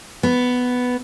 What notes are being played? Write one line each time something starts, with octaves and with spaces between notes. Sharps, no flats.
B3